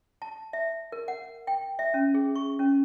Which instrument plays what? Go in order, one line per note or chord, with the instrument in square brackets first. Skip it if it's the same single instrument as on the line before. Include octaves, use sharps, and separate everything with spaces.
[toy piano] A5
E5
A#4
F#5
G5
E5
C#4
G#4
C#6
C#4